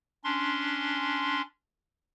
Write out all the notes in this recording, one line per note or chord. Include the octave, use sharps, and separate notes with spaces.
C#4 D4 C6